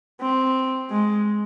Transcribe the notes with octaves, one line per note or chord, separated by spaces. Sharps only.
C4
G#3